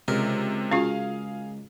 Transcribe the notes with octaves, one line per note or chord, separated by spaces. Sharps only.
C#2 C3 A#4
C#4 F4 F#4 G#4 F5